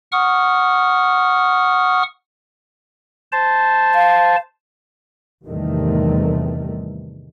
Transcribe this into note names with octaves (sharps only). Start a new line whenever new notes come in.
F#5 C#6 D#6 F6
C5 A5
F5
E2 A2 C3 D#3 G3 A3